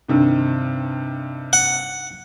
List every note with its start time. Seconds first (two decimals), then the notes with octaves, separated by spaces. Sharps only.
0.08 G2 C3 D#3
1.53 F#5